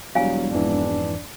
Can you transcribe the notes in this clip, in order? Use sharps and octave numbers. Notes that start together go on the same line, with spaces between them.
E1 F#3 G3 F5 G#5
F2 G#2 E3 D4